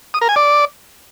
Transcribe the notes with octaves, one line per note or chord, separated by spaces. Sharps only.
D#6
A#4
G#5
D5